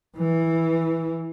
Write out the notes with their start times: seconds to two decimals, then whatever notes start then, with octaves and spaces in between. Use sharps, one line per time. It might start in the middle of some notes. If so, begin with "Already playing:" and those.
0.17 E3